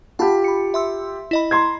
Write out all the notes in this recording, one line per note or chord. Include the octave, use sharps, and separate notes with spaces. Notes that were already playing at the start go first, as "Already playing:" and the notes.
F4 G4 F#5 A5 B5
B5 C#7
E5 C6 E6
E4 D#5 B5
A#5 C6 G#6